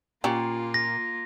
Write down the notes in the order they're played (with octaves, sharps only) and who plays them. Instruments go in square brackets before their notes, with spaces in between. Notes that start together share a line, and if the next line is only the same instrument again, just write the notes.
[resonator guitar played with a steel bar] A#2 [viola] A#3 F4 [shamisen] C#4 G4
[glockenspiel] A#6